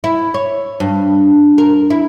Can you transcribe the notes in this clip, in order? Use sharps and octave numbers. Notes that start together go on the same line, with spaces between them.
E4
C#5
G2
A#4
E4